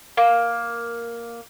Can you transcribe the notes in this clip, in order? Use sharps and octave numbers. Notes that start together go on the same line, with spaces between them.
A#3